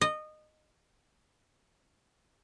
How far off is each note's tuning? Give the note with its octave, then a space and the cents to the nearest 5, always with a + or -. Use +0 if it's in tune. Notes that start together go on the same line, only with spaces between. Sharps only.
D#5 -20